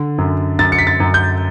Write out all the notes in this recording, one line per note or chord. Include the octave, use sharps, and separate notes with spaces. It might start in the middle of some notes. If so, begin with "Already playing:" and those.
Already playing: D3
F#2
F#2 A6
C#7
B6
A6
F#2
G6